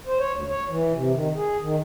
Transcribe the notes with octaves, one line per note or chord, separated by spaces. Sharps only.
C5
C#5
D2
C#5
E3
C3
D#3
G#4
D#3